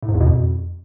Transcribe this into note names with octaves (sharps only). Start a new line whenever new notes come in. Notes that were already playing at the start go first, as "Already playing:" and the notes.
A2
G#2
E2
B2
F2